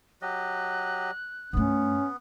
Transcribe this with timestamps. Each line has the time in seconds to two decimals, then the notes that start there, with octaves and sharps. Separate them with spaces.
0.22 F#3 G4 D#5 F#6
1.53 G2 A3 B3 C#4